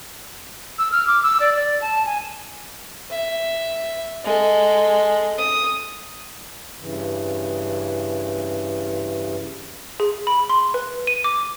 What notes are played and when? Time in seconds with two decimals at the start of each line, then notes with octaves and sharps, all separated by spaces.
0.78 E6
0.92 F6
1.07 D6
1.23 E6
1.40 D5
1.56 D5
1.82 A5
2.06 G#5
3.10 E5
4.24 G#3 A4
5.38 D#6
6.79 G2 C#3 E3
10.00 G#4
10.27 B5
10.49 C6
10.74 B4
11.07 D#7
11.24 D6